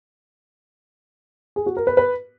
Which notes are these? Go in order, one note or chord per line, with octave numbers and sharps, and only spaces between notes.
G#4
F#4
A#4
B4
B4